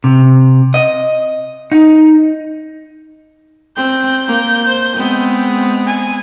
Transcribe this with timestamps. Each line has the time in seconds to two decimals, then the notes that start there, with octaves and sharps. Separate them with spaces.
0.04 C3
0.74 D#5
1.72 D#4
3.77 C4 G6
4.27 A#3
4.67 C5
4.96 G#3 B3 C4
5.87 G#5